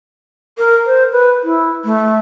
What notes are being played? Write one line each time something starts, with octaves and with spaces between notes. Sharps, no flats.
A#4
C5
B4
E4
A3